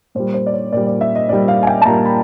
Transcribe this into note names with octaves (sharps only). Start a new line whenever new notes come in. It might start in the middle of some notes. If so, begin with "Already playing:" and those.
A#2 G3 C5
C5
D5
C#5
A#2 G3 D5
D5
E5
D#5
A#2 G3 D5
F5
G#5
G5
A5
A#2 G3 A#5
B5